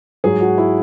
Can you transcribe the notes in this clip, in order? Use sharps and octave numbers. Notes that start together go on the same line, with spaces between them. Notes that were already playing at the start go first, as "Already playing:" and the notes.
G#2 F#3 G#4
F#4
E4